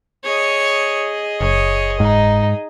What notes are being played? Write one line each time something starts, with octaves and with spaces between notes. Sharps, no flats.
G#4 C#5 D#5
F#1 C#5
G#2 D#4